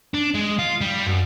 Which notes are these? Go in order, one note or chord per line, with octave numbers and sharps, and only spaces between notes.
D4
G#3
F4
G3
F#2